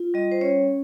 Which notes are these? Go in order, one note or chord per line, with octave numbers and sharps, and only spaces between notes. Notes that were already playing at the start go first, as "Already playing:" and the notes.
Already playing: F4
G3 D#5
C5
C#4 C#5